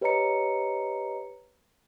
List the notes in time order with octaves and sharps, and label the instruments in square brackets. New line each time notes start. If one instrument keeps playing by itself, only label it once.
[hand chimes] G4 B4 C#5 D#5 A#5 C#7